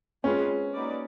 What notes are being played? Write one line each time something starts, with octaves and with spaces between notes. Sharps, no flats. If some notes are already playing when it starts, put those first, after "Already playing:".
G#3 C4 C#4 F4 G#4 B4
A#3 D#4 F#4 B4 D5